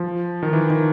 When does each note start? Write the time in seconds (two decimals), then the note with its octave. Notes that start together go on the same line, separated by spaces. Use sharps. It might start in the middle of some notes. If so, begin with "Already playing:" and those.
Already playing: F3
0.43 D#3
0.53 E3
0.70 D#3